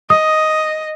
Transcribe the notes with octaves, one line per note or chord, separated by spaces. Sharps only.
D#5 D#6